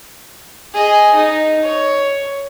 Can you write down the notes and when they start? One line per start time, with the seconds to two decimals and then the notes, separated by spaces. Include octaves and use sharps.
0.74 G#4 D#5
1.15 D#4
1.63 C#5